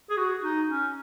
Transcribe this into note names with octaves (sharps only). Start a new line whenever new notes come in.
G#4
F#4
D#4
C#4